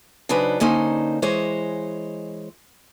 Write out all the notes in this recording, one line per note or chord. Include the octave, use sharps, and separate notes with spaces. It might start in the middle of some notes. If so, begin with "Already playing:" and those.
C#3 F#3 D4 D#4 B4 C5
D3 A#3 C#4 D#4 C5
E3 G#3 C5 C#5 D#5